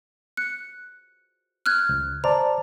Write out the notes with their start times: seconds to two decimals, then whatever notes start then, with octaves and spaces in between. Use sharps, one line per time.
0.37 F#6 C#7
1.66 F6 F#6 G#6
1.89 C#2
2.24 C5 D5 A5 A#5